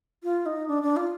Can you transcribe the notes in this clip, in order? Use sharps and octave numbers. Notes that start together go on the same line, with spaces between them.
F4
D#4
D4
D4
F4